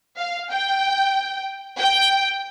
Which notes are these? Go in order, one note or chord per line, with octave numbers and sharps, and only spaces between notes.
F5
G5
G5